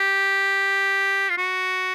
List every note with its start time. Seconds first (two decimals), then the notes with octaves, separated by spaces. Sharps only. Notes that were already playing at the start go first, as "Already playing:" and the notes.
Already playing: G4
1.30 F4
1.37 F#4